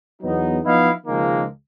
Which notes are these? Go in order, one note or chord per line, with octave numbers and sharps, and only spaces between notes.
E2 F#3 B3 D#4
F3 B3 D#4 E4 D#5 F5
C#2 D#3 F3 G#3 A#3